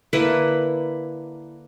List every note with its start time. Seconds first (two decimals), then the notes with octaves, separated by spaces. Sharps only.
0.13 D3 A#3 E4 B4